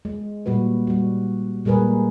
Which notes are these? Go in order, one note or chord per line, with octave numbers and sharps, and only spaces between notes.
G#3
A#2 G3 F#4 B4
G3 F#4
A#2 G3 G#3 G#4 A#4 B4